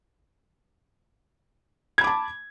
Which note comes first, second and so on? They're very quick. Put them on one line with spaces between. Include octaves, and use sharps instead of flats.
G#6 B5 D6 A5